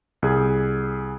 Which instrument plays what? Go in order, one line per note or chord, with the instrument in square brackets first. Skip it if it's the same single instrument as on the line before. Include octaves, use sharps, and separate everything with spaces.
[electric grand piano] C2 G#4